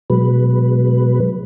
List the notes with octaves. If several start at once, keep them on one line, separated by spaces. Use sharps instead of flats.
B2 F#3 G#3 B4